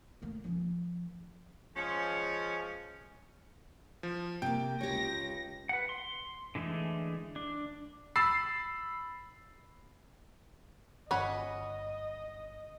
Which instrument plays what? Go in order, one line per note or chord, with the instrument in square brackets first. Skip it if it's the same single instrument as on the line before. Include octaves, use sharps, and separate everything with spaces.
[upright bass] A3 A#3
F3 C#4
[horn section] F3 G#3 C#4
[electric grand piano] F3
[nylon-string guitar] C3 A#3 [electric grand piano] G5
[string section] C#2 A#6 [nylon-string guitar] G4 C#5
[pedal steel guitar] B4 F#5
C6
D3 E3 G#3 A3
D4
[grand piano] B5 E6 A6 C7
[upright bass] G1 D3 [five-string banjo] C#4 F#5 B5 [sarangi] D#5